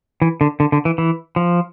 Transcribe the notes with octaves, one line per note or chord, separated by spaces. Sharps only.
E3
D3
D3
D3
E3
E3
F3